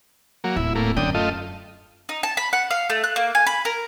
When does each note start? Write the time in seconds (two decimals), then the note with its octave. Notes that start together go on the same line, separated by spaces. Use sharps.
0.44 F#3 A#3
0.56 D1 E4
0.75 A2 A#3
0.97 F#2 D3 G5 D#6
1.15 A3 F4 D#5
2.09 D#4
2.23 A5
2.37 B5
2.53 F#5
2.71 F5
2.90 A3
3.04 F#6
3.16 A#3
3.35 G#5
3.47 B5
3.65 A#4